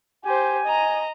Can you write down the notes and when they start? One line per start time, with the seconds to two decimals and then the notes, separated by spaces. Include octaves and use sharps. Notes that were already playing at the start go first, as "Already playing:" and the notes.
0.25 G4 C5 G#5
0.66 D#5 A#5